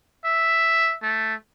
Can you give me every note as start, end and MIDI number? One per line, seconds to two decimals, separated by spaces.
0.25 0.95 76
1.03 1.34 57